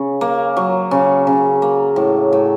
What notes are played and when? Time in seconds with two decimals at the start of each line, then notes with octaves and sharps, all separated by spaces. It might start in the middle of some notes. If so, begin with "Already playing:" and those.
Already playing: C#3
0.21 A#3
0.57 F#3
0.91 C#3
1.27 C#3
1.62 A#3
1.96 A2
2.32 A2